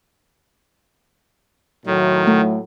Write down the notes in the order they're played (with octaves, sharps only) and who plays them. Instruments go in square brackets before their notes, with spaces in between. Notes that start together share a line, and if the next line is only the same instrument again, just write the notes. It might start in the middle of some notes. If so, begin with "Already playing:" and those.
[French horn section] A2 F#3 [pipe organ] D#3
[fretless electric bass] A3